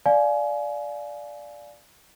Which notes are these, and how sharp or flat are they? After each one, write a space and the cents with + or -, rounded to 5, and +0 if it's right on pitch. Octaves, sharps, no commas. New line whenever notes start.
D5 +0 F5 +0 G#5 +25